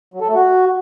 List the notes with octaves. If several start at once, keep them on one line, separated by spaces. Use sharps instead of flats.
F#3
A4
A3
F#4